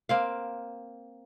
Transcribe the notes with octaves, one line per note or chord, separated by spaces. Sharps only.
A#3 C4 F5